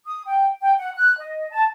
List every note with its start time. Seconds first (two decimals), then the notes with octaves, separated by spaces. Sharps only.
0.05 D#6
0.25 G5
0.61 G5
0.78 F#5
0.95 F#6
1.18 D#5
1.51 A5